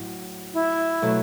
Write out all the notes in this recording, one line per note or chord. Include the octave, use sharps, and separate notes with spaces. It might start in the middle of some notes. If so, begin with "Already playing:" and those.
Already playing: A2 F#3
E4
B2 F#3 A3